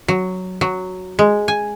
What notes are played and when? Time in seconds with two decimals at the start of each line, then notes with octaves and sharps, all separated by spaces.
0.08 F#3
0.61 F#3
1.19 G#3
1.48 G#5